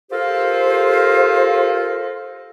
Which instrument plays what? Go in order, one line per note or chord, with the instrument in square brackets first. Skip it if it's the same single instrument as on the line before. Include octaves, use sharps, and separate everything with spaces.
[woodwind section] F4 G4 A4 A#4 C5